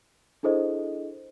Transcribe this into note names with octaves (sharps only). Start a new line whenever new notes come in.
D4 E4 G#4 A4 C5 D#5